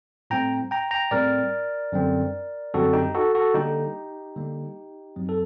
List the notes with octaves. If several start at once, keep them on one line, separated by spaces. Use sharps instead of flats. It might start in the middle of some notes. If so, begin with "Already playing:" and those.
A2 G3 C4 G5 A#5
G5 A#5
G5 A#5
A2 G3 C4 A#4 D5
F#2 D3 G3 C4
F#2 D3 G3 C4 F#4 A4
D#4 G4
F#4 A4
F#4 A4
D3 G3 A#3 D#4 G4
D3 G3 A#3
F#2 F#3 C4
A4